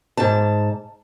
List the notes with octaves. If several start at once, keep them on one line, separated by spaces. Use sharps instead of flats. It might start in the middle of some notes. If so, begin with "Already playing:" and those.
G#2 A5